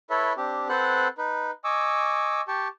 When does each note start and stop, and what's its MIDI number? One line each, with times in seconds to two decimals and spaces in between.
0.10 0.33 64
0.10 0.33 69
0.10 0.33 71
0.10 0.33 73
0.10 0.33 76
0.37 0.68 60
0.37 0.68 62
0.37 0.68 67
0.69 1.08 60
0.69 1.08 69
0.69 1.08 71
0.69 1.08 72
0.69 1.08 78
0.69 1.08 90
1.18 1.51 63
1.18 1.51 71
1.64 2.41 75
1.64 2.41 80
1.64 2.41 85
1.64 2.41 86
1.64 2.41 88
2.48 2.68 67
2.48 2.68 79
2.48 2.68 81
2.48 2.68 85